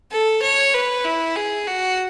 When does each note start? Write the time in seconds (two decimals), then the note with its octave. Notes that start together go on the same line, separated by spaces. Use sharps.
0.11 A4
0.42 C#5
0.74 B4
1.05 E4
1.36 G#4
1.67 F#4